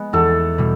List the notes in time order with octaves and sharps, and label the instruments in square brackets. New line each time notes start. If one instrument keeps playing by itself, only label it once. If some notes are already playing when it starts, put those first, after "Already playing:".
Already playing: [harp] G#3 B3
[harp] E2 [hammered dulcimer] A4
[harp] B2 G3